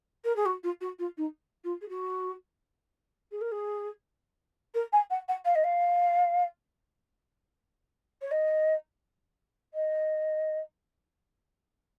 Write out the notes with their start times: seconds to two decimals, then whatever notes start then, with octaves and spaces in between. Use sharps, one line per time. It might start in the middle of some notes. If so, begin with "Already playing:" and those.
0.24 A#4
0.36 G#4
0.46 F#4
0.63 F4
0.81 F#4
0.99 F4
1.17 D#4
1.64 F4
1.81 G#4
1.89 F#4
3.32 G#4
3.41 A#4
3.52 G#4
4.74 A#4
4.92 G#5
5.10 F#5
5.28 F#5
5.45 F5
5.55 D#5
5.64 F5
8.22 C#5
8.31 D#5
9.74 D#5